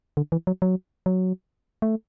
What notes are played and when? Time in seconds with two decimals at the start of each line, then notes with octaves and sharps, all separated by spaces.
0.17 D3
0.32 E3
0.47 F#3
0.62 F#3
1.06 F#3
1.82 A3